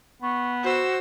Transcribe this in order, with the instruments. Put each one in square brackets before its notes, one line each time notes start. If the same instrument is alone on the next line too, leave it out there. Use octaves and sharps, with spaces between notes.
[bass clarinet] B3 [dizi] C#6
[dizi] F#4 [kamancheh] C5 E6